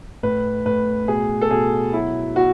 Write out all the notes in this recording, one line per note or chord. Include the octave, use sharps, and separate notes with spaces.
A2 B4
A2 B4
B2 G#4
A4
B2 G#4
F#3 E4
B2 F#4